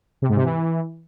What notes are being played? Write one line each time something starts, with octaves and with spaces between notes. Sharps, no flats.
C3
G#2
C3
E3